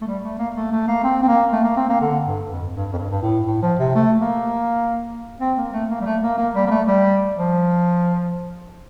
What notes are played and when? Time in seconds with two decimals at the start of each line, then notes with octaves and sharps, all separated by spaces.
0.02 A3
0.07 G3
0.24 A3
0.39 A#3
0.56 A3
0.72 A3
0.88 A#3
1.04 C4
1.23 C4
1.28 A#3
1.53 A3
1.64 A#3
1.77 C4
1.89 A#3
2.01 D3
2.26 G2
2.49 F2
2.74 G2
2.93 F2
2.98 G2
3.11 G2
3.22 A2
3.47 A2
3.63 F3
3.79 C3
3.95 A3
4.20 A#3
5.41 C4
5.57 A#3
5.73 A3
5.90 A#3
6.01 G3
6.06 A3
6.22 A#3
6.38 A#3
6.55 G3
6.66 A#3
6.71 A3
6.87 G3
7.35 F3